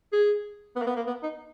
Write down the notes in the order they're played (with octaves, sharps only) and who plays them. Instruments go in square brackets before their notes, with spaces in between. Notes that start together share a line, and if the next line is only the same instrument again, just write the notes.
[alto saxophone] G#4
B3
A#3
B3
A#3
B3
D#4